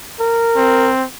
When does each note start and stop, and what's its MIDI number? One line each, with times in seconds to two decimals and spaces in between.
0.20 0.92 70
0.56 1.05 60